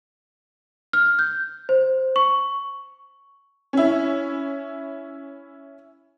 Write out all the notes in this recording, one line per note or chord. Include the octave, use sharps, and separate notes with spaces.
F6
G6
C5
C#6
C#4 E4